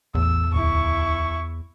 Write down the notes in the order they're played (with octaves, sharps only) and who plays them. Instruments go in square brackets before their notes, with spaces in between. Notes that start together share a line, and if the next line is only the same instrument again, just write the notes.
[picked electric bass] A1 [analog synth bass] E2 [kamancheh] E6
[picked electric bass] D1 [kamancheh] E4 C#6